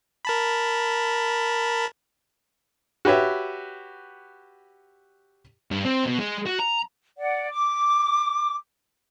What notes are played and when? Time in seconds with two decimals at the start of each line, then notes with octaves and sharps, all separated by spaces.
0.25 A#4 A5 B5
3.05 F#4 G4 B4 C#5 E5
5.71 G2
5.85 C4
6.05 B2
6.19 G#3
6.47 F#4
6.60 A#5
7.18 D5 F#5
7.51 D6